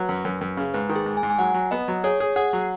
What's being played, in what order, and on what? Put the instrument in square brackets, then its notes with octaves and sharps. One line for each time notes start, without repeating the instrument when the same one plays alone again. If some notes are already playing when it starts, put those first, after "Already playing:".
Already playing: [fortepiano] F#3 [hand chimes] B4
[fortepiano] F#2
F#2
F#2
C#3
[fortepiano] G#2 [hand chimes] B4
[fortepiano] D#3
[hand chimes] G#4
[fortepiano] G#2
[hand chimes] G#5
[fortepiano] G#2
[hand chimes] G#5
[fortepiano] F#3 [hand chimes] F#5
[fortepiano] F#3
[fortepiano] B3 [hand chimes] D#5
[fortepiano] F#3
[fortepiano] G#4 [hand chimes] C#5
[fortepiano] G#4
[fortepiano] G#4 [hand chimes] F#5
[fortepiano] F#3